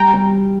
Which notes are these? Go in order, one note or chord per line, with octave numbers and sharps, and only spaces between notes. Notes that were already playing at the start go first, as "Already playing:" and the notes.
Already playing: G3 G5 A#5
G3